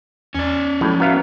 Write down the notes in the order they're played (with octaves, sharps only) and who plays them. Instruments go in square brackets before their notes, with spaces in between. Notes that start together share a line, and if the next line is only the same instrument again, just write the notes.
[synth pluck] E2 [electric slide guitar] C#4 D5
[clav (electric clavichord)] A2 [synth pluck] F3 F#3 G#3
[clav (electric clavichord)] F#3 B3 F5 [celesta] C#5 E5 A#5 [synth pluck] B6